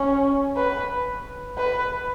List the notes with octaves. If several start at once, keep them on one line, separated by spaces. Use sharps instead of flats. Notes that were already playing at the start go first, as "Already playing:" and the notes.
Already playing: C#4
B4
B4